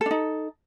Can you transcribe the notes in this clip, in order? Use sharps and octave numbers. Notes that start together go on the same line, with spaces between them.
D4 D#4 A4